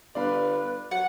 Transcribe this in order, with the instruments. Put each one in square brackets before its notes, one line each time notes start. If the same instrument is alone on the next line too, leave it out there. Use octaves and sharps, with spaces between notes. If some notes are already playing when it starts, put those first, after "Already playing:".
[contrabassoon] G1 [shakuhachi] B4 [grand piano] D5 F5 B5
[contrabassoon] F#3 [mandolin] F#5